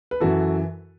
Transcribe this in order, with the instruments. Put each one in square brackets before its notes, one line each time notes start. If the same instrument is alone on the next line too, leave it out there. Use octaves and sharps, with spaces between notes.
[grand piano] B4
F#2 E3 F#4 A4